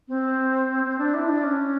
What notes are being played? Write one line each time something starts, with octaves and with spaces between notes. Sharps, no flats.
C4
C4
D4
E4
D4
C#4